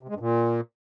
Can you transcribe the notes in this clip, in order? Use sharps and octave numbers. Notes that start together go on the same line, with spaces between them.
C3
G#3
G2
A#2